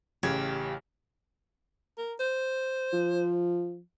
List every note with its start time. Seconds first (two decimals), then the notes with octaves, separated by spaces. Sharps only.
0.23 A1 C#3 G4 G#6
1.98 A#4
2.20 C5
2.93 F3